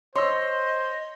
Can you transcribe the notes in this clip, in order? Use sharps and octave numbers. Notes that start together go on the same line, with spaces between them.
C5 C#5 D#5 C6 E6